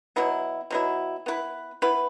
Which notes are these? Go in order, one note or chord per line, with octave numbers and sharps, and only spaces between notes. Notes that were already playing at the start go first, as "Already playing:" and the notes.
B2 F#3 B3 E4
B2 F#3 B3 E4
B3 E4 B4
B3 E4 B4